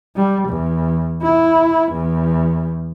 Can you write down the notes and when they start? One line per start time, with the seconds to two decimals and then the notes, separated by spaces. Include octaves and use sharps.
0.16 G3
0.49 E2
1.23 E4
1.93 E2